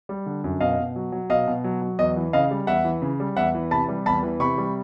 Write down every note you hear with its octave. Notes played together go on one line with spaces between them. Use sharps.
G3
D3
F#2
B2 D#5 F5
B2
F#3
F#3
B2 D#5 F5
B2
F#3
F#3
E2 D#5
E3
C#3 D#5 F5
G3
E2 E5 F#5
E3
C#3
G3
E2 E5 F#5
E3
C3 A5 B5
G3
E2 A5 B5
E3
C3 B5 C#6
G3